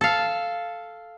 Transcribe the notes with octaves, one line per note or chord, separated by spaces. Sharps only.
A4 F5